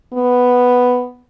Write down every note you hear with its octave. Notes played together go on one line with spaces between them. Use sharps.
B3